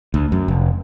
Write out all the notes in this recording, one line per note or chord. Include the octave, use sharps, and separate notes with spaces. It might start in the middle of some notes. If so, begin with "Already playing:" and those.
D2
F#2
F1